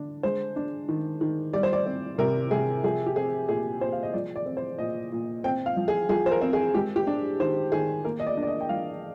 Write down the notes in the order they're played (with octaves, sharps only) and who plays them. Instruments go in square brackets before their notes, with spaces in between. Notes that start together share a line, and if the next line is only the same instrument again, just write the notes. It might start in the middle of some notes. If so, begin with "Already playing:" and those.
Already playing: [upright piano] D3 D4
G#3 C5
D4
D#3
D#3
G3 D5
C5
D5
C4
C3 A#4
C3 G#4
F3 G#4
G4
C4 G#4
A#2 G#4
A#2 C5
F5
D#5
F3 D5
D5
C4
C5
A#2 D#5
A#2
C4 G5
F5
F3
G#4
F3 G#4
C5
A#4
C4
G#4
G#3 G4
G4
D4
D#3 C5
D#3 G#4
A#3 A#4
D#5
D5
D4
D5
D#5
G5
F3 F5